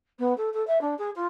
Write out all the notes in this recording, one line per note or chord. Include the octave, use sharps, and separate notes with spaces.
B3
A4
A4
E5
D4
G#4
F4